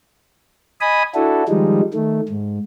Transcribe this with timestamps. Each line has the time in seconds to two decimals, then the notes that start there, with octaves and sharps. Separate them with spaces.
0.81 D#5 G#5 B5 D#6
1.15 D4 E4 F#4 A4
1.48 D#3 F3 G3 G#3 D#4
1.94 D#3 A3
2.29 G#2